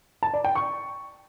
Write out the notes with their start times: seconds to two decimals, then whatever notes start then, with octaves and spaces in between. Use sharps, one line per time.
0.23 A5
0.34 D5
0.44 G5
0.55 C#6